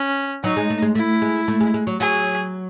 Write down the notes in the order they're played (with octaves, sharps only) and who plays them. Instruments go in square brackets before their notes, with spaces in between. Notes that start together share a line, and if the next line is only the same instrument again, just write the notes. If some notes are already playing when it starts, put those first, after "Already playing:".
Already playing: [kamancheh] C#4
[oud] F#3 [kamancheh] D#4
[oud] G#3
A3
G#3
[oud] A3 [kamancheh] E4
[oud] G#3
A3
G#3
G#3
F#3
[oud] F#3 [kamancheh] G#4